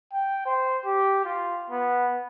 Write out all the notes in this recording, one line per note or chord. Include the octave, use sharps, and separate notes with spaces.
G5
C5
G4
F4
B3